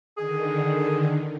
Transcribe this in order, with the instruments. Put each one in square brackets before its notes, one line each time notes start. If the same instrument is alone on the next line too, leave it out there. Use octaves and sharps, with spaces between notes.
[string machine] D3 D#3 [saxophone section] G#4